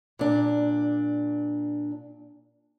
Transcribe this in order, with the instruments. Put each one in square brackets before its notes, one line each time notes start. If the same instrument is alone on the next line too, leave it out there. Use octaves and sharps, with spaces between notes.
[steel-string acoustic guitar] A#2 D4